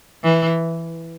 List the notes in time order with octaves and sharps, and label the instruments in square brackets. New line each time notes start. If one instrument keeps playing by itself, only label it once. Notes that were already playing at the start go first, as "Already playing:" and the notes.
[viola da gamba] E3